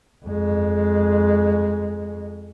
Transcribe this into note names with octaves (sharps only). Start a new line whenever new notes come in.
F2 G#3